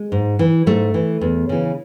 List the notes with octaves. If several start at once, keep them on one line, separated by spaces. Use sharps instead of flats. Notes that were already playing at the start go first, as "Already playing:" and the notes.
Already playing: G#3
G#2
E3
G#2 A3
E3
E2
C#3 E3